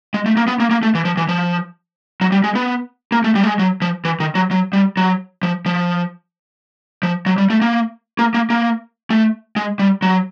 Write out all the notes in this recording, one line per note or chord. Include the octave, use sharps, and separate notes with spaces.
G#3
A3
A#3
B3
A#3
A#3
A3
E3
F3
E3
F3
F#3
G3
G#3
B3
A#3
A3
G3
A3
G#3
F#3
F3
E3
D#3
F#3
F#3
G3
F#3
F3
F3
F3
F#3
G3
A3
A#3
A#3
A#3
A#3
A3
G#3
G3
F#3